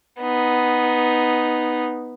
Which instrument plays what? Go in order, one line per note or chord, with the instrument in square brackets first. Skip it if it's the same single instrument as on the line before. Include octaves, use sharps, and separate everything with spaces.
[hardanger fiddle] B3 D#4